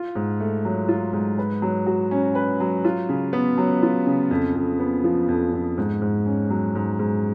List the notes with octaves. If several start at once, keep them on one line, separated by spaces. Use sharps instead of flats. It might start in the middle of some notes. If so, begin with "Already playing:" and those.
Already playing: F4
G#2
A3
F#3
F4
G#2
B4
F#3
F#4
C#4
B4
F#3
F4
C#3
B3
F#3
F4
C#3
F2
F2
B3
F3
F2
F2
G#2
G#2
C#4
F#3
G#2
G#2